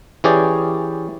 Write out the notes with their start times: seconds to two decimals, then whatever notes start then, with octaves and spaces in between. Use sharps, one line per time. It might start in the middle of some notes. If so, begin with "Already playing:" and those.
0.24 E3 C#4 G4 G#4 C#5 D5